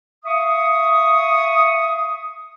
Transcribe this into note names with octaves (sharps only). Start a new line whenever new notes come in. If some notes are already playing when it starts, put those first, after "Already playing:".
E5 F5 C#6 D#6